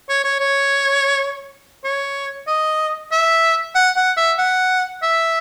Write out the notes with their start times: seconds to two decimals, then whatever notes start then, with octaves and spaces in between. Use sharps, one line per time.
0.09 C#5
0.24 C#5
0.40 C#5
1.84 C#5
2.47 D#5
3.12 E5
3.75 F#5
3.97 F#5
4.17 E5
4.38 F#5
5.02 E5